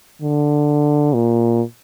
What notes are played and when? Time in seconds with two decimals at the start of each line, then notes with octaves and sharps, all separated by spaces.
0.22 D3
1.14 A#2